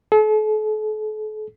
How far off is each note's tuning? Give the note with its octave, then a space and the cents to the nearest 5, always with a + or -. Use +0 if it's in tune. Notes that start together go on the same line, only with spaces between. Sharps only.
A4 -40